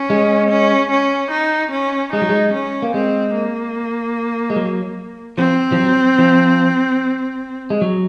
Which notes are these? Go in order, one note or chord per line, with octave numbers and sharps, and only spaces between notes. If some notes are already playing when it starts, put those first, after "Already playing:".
Already playing: C#4
G#3
C#4
C#4
D#4
C#4
G#3 D#4
F#3
G#3
C#4
A#3
G#3 C4
A#3
G#3
F#3
F3 C4
F3
F#3
F3
G#3
F#3